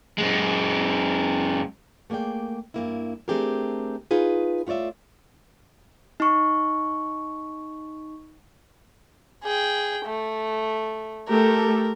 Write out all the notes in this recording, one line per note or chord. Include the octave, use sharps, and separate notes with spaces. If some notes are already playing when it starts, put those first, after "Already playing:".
F#2 G#3
A3 A#3 G#4 D5 G5
G2 A#3 E4
A3 C4 D4 G4 G#4 A#4
D#4 F4 G#4 B4
A3 F4 C#5 D5 E5
D#4 C#6
G#4 G5
A3
A3 G4 A4 A#4